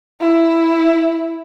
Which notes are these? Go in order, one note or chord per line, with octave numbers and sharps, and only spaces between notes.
E4